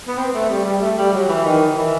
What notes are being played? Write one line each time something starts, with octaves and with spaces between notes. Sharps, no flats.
B3
C4
A3
G3
G3
A3
G3
F#3
E3
D#3
E3